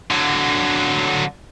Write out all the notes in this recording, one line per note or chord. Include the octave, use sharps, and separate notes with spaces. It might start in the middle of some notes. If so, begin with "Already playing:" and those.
D3 F#3